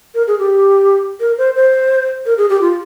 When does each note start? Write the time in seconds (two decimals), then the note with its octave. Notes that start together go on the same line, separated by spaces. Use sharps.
0.15 A#4
0.27 G#4
0.39 G4
1.20 A#4
1.38 C5
1.56 C5
2.26 A#4
2.38 G#4
2.49 G4
2.61 F4